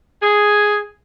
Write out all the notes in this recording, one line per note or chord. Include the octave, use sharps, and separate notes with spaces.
G#4